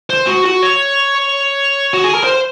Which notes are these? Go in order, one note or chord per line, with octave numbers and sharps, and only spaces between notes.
C5
F#4
F#4
C#5
F#4
G#4
A#4
C5